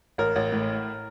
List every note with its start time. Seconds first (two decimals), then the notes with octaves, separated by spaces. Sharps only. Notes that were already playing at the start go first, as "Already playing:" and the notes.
0.18 A1 A#4
0.36 A1
0.52 A2